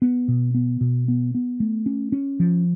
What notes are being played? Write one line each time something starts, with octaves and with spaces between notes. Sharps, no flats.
B3
B2
B3
B2
B3
B3
A3
C#4
C#4
F3